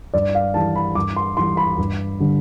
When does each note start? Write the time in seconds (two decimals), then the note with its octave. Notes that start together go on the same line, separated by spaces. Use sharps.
0.14 G2 D5
0.35 F5
0.54 E3 G3 A5
0.76 B5
0.95 G2 D6
1.17 C6
1.37 E3 G3 C6
1.57 B5
1.78 G2
2.20 D3 G3